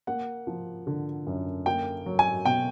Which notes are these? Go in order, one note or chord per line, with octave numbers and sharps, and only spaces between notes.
A#3 F#5
F3
D3
F#2
A#3 G5
F#3
G#5
B2 G5